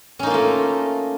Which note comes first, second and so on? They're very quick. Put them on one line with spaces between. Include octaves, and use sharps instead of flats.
C#4 D#4 A#3 F4 A3